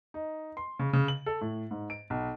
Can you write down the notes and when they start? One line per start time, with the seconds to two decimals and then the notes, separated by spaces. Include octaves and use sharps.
0.14 D#4
0.57 C6
0.79 C#3
0.93 C#3
1.08 F#7
1.26 A4
1.41 A2
1.71 G#2
1.90 D7
2.10 B1